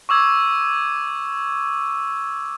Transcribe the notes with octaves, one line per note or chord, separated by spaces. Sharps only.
C#6 D6 E6 G#6